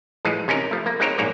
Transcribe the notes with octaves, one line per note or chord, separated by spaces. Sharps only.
A2 E3 F3 G#3
C3 C#4 D#4 A#4
F3 A3
A#3
G#3 C4 D#4 A#4 C5 C#5
A#1 G#2 A#3 C#5 D5